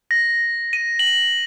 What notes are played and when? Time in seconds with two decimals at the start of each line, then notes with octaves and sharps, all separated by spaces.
0.11 A#6
0.73 D#7
0.99 F#7